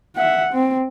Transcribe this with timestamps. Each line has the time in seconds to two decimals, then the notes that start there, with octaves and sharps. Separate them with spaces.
0.16 E5 F#5
0.53 C4